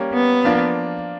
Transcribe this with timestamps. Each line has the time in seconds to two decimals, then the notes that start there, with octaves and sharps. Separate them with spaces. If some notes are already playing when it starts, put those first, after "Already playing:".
Already playing: G3 A#3 C#4
0.14 B3
0.45 F3 A#3 D4 F4